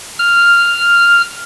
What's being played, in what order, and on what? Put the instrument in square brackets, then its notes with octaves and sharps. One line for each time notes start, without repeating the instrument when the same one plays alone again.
[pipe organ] F6